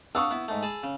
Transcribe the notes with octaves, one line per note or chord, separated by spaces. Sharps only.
D4 F5 F#5 C#6 D#6 E6
B3 E4
G#2 A3
G#4 A5 B5
C#3